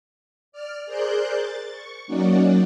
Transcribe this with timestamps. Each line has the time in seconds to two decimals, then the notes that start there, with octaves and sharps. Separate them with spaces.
0.52 D5 F6
0.86 G#4 A#4 C5 D5 F#6 G6
1.34 A6
1.71 C#6
2.07 F#3 A#3 C#4 D#4 F#4 D5